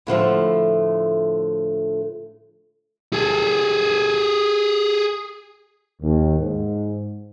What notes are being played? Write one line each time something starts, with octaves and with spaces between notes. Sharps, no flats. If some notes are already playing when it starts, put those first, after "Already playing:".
A2 D3 F3 A3
G#4 A4
D#2
G#2